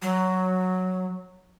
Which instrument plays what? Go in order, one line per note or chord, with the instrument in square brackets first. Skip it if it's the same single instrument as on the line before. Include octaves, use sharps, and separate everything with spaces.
[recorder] F#3